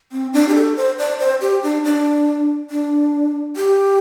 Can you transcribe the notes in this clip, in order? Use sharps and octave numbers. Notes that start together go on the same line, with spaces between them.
C4
D4
G4
A4
C5
D5
C5
G4
D4
D4
D4
G4